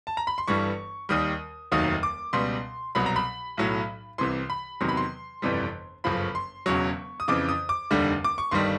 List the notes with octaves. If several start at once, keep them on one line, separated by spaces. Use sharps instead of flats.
A5
A#5
B5
C6
G1 G2 E3 G3 C#6
D#2 D#3 G3 D#6
F1 D#2 D#3 F#3 D#6
D6
C#2 B2 G3 C6
C2 B2 F#3 B5
A#5
B5
B1 A2 F#3
C2 C3 E3 C6
B5
E2 C3 D#3 F#3 C6
B5
C6
G1 F2 C3 E3 G3
G1 F#2 C#3 F3 B5
C6
E1 E2 C#3 F#3 C#6
D#6
F2 C#3 E3 D6
D#6
D6
F1 D#2 D3 G3
D6
C#6
G1 G2 D#3 G3 C6